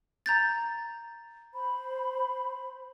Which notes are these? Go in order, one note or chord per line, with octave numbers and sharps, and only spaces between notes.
A#5 G6 A6
C5 B5